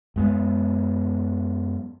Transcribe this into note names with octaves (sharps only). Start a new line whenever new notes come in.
F#2 G#3 B3